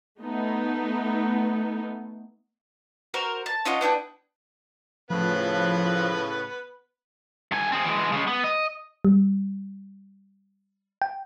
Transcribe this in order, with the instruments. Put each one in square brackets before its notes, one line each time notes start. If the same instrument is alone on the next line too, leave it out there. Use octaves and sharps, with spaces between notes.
[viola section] A3 B3 D#4
[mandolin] F#4 A#4 C5
A5
C#4 F4 D#5 F#5
B3 D4 E4 G5
[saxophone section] A2 C#3 [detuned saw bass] F3 [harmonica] B3 B4
[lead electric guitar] G2 G#5
C4 G#4
E3 G#3
C#3 G#3
B3
D#5
[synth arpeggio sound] G3
G5